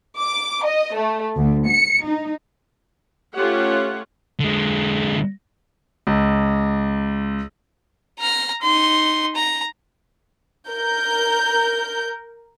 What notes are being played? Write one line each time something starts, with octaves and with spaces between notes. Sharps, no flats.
D6
D#5
A3
D2
C#7
D#4
A3 C#4 F4 G4 C#5 F#5
D3 G#3
C#2
A#5 F6
D#4 C6
A#5
A#4 G6